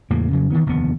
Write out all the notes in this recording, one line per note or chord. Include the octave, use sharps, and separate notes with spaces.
E2 A2 C#3 A#3
F2 C#3 F#3
D#3 E3 B3
F1 D#2 D3 B3